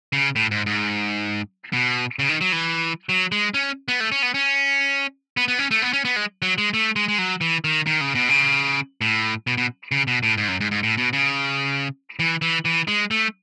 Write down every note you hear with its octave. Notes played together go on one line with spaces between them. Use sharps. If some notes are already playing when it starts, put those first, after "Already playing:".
C#3
A2
G#2
G#2
B2
C#3
D#3
F#3
E3
F#3
G#3
C#4
B3
A3
C#4
B3
C#4
B3
B3
C#4
A3
B3
C#4
B3
G#3
F#3
G#3
A3
G#3
G#3
F#3
E3
D#3
D#3
C#3
B2
C#3
A2
B2
B2
C#3
B2
A2
G#2
F#2
G#2
G#2
A2
B2
C#3
E3
E3
E3
G#3
A3